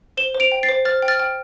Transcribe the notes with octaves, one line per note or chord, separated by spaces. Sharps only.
C5 E7 G7
C5
D7 F7
G5
A6 C7
C5
C5 F6 A6
G5
F6 A6
G5